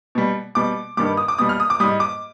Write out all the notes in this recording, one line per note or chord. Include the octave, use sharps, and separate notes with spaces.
B2 G3
B2 G3 D6
G2 D#3 G3 D6
D#6
D6
B2 G3 D#6
F6
D#6
D6
G#2 G3 D#6
D6